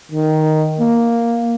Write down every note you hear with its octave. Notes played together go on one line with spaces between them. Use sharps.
D#3
A#3